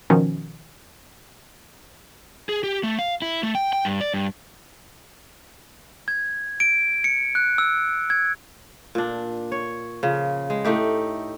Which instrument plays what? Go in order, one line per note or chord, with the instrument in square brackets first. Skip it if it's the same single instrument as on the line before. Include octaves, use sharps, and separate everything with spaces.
[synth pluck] B2 D#3 F3 C#4
[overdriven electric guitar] G#4
G4
A3
F5
E4
A3
G5
G5
G2
D5
G2
[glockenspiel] G#6
D7
C#7
F#6
E6
G#6
[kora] A#2 D4
C#5
C#3 F3
G#3
A2 A3 D#4 G4